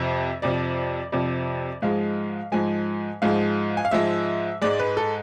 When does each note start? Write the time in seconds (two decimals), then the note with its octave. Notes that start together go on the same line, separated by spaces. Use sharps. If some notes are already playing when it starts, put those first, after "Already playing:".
Already playing: F2 C3 F3 E5
0.42 F2 C3 F3 D5
1.12 F2 C3 F3 D5
1.82 G#2 F3 G#3 F5
2.52 G#2 F3 G#3 G#5
3.22 G#2 F3 G#3 F5
3.77 G#5
3.85 F5
3.91 G#2 F3 G#3 E5
4.62 G#2 G#3 D5
4.79 B4
4.97 A4